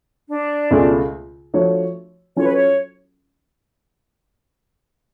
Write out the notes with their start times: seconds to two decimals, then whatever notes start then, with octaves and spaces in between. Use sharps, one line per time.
0.29 D4
0.71 C#2 B2 A3 F4 G#4
1.54 F3 A3 D4 F#4 C#5
2.36 F#3 C#4 F4 A4 C#5
2.45 B4
2.53 C#5